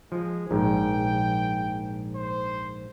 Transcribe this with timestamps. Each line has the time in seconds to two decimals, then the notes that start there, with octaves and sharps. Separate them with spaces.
0.12 F3 G#3
0.51 A#1 G#2 G5
2.15 C5